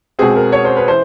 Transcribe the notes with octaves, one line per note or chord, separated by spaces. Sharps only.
B2 G#3 C4 G#4
A#4
C#5
C5
B4
E3 C5